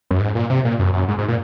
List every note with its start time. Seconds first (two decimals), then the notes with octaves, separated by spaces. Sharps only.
0.11 F#2
0.20 G#2
0.35 A#2
0.50 C3
0.65 A#2
0.79 F#2
0.94 F#2
1.08 G#2
1.18 G#2
1.28 A#2